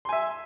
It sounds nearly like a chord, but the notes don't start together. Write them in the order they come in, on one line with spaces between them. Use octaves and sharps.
C6 G#5 E5